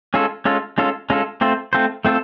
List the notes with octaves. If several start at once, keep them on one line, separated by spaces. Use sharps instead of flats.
G#3 C#4 F4 A4
G#3 C#4 F4 A4
G#3 C#4 F4 A4
G#3 C#4 F4 A4
A3 C4 F4 A4 C5
A3 C4 F4 A4 C5
A3 C4 F4 A4